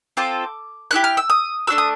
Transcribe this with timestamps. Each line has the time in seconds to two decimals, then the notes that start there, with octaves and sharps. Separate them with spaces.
0.17 C4 F4 A4 D6
0.91 C#4 E4 G4 F#6
1.04 F6
1.17 E6
1.30 D#6
1.67 A3 D4 F#4 E6
1.78 D#6